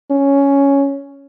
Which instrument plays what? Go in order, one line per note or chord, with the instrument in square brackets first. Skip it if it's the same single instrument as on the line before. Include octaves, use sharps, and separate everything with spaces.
[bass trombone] C#4